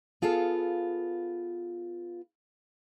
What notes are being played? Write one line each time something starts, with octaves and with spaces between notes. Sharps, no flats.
B3 F4 G#4 A4 F5